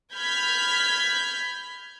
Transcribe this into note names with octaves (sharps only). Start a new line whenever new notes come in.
B5 F6 G6 G#6 B6